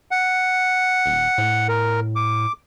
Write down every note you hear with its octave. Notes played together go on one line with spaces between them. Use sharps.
F#5
D#1
A2
A#4
D6